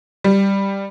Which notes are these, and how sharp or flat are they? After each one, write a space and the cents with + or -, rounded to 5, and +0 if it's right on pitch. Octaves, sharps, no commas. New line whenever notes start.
G3 +5